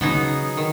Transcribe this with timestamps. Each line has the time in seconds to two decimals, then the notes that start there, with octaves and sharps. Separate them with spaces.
0.01 C#3 F#3 B3 D#4 G#4
0.57 D#3